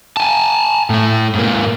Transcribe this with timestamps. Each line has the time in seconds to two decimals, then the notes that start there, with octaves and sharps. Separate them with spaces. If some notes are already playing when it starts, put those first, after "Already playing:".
0.17 G#5 A5
0.90 A2 A3
1.35 G#2 A#3